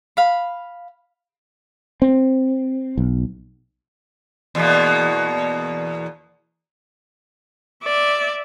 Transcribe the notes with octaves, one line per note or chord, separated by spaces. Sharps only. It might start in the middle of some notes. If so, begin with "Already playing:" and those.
F5 B5
C4
B1
E2 B2 A#3
D5 E5